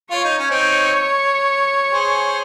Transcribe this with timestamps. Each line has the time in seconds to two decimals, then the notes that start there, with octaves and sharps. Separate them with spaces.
0.10 F4 C#5
0.24 D#4
0.38 C#4
0.51 C4 D#4
1.92 G#4 C5